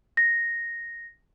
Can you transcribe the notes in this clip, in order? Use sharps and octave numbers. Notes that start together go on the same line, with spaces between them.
A#6